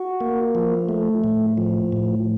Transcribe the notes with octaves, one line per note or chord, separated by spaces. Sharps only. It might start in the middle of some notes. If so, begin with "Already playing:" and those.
Already playing: F#4
A#3
F3
A3
A2
F3
A2